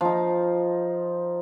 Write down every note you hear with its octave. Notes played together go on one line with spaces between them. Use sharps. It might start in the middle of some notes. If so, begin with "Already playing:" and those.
F3 D#4